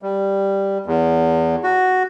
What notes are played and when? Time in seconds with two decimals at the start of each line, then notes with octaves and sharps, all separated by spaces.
0.02 G3
0.86 E2
1.64 F#4